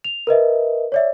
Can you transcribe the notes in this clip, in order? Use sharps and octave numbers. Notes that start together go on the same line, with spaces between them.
F7
A#4 B4 D#5 E5
C#5 D5 E5